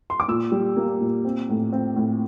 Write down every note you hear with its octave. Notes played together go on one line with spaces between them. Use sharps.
C6
D6
A#2 E6
G3
A#3
A#2
C4
A2
C4
A2